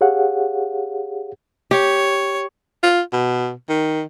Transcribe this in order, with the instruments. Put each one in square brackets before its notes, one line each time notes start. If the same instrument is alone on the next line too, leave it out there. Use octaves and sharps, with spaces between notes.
[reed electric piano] G4 G#4 C#5 F5 F#5
[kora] G4 [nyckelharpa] C#5
[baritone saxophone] F4
B2
D#3